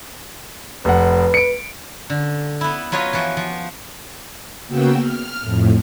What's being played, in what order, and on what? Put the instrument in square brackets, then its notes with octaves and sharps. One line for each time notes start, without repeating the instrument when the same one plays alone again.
[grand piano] F1 F#5 [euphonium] B4
[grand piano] C#7 D7
[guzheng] D3
B3 E4
F#3 F4 B4 C#5 D#5
E3 F3 F#4
F3
[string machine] C#3 A#3 B3 F#4 G5 E6
F6
F2 A2